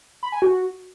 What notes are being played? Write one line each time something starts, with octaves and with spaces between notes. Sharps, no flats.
B5
G#5
F#4